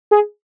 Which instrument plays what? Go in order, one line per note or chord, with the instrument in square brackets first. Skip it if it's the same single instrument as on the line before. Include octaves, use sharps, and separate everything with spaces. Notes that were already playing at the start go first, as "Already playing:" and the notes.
[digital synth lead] G#4